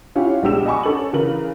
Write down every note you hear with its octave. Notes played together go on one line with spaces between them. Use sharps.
C#4 E4 F4 G4 C#5 F#5
A#1 G#3 B3 G4 E6 E7
D#5 F#5 G#5 B5 C#6 D6
C#4 A4 F#7
C#3 E3 A#4 B4 F#7